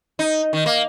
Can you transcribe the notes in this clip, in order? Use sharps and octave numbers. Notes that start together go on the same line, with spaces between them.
D#4
D#3
A#3